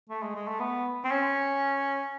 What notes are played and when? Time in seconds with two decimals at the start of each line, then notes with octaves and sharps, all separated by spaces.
0.09 A3
0.23 G#3
0.35 G#3
0.48 A3
0.60 B3
1.04 C4
1.11 C#4